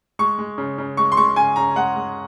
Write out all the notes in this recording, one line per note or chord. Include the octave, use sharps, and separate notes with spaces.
G#3 C#6
G#3
C#3
C#3
G#3 C#6
C6
G#3 C#6
C#3 G#5
C#3 A#5
G#3 F#5
G#3